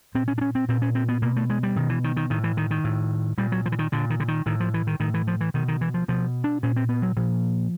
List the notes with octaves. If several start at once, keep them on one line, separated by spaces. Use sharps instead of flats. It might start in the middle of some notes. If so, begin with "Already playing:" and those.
A#2 C4
C#4
D4
C#4
C4
A#2 C4
C#4
C4
B3
B2 A#3
A3
G#3
G3
B2 D#3
E3
D#3
D#3
A2 D#3
E3
D#3
D#3
A2
A#2 G3
F#3
F3
E3
D#3
A#2 D3
D#3
D3
D#3
A2 D#3
F3
E3
D#3
A2 D#3
E3
F3
E3
B2 D#3
D#3
E3
F3
B2 F3
D4
A#2 C#4
C4
B3
F#3
A#2 F3